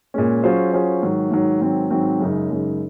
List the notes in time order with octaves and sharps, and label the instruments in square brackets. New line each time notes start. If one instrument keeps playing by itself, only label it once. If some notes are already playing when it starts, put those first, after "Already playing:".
[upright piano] A#2 G#3 C#4
F#3 C#4 F4 G#4 C5
F#3 C#4 F4 G#4 C5
G#2 D#3 F#3
G#2 D#3 F#3
G#2 D#3 F#3 C4
G#2 D#3 F#3 C4
F#2 C#3 G#3 D#4
F#2 C#3 G#3 D#4